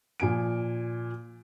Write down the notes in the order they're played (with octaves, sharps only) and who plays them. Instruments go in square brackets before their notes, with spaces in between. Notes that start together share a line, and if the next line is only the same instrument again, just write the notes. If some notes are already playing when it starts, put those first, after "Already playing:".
[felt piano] A#2 F3 G#5 D7